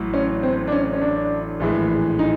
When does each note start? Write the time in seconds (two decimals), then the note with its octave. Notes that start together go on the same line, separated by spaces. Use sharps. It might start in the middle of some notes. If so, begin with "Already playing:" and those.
Already playing: A1 A2 F#3
0.14 C#4
0.43 C4
0.67 D4
0.72 C#4
0.93 C#4
1.02 D4
1.60 A#1 A2 E3 G#3
2.19 D#4